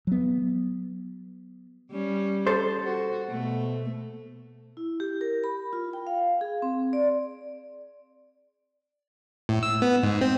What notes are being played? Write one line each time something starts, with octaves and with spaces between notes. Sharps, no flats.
F#3 B3
G3 C#4
A4 C5
F#4
B2 A3
E4
G4
A#4
B5
F4
G5
F5
G#4
C4
D5
A2
E6
B3
G#2
C4